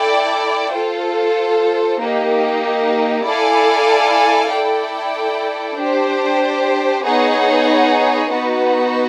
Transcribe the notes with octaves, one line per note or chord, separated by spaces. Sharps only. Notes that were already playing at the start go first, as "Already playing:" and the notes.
Already playing: E4 A4 D5 G5
F4 A4 C5
A#3 D#4 G4
E4 A4 D5 F5 G#5
E4 A4 D5 G5
D4 G4 C5
B3 D#4 G#4 C#5 F#5
B3 D#4 F#4 B4